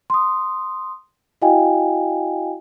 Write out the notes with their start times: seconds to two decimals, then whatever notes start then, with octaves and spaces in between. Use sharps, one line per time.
0.10 C6 D#6
1.42 E4 F#4 D#5 F5 G5 G#5